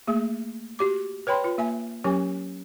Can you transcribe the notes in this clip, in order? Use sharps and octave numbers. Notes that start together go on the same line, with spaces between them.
A3 A#3 G#4
F#4 G4 D6
B4 C#5 G5 B5 C6
F4 B4
A#3 E5 G#5
F#3 C#4 G4 A#4 G#5